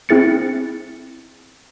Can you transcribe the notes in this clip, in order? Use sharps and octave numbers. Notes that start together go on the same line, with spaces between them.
C4 E4 G#4 A6 C#7